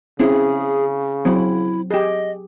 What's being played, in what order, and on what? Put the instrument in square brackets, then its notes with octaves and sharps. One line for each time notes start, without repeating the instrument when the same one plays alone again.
[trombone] C#3 [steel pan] C4 C#4 E4 [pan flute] G#4
[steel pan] F#3 C4 [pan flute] E4
[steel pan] G4 G#4 [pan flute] D#5